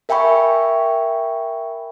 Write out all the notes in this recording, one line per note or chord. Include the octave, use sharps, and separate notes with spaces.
A#4 E5 G5 G#5 B5 C#6